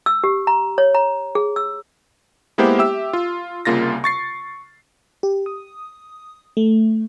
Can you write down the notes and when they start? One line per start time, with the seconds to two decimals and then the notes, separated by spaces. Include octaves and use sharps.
0.06 E6
0.24 G4
0.47 A#5
0.78 C#5
0.95 A#5
1.35 G#4
1.56 E6
2.58 G#3 A#3 B3 E4 G4 C5
2.79 G4 E5 E6
3.13 F4
3.65 C2 C#3 A#3 F4 A6 A#6
4.04 C#6 A6 C7
5.23 G4
5.46 D#6
6.57 A3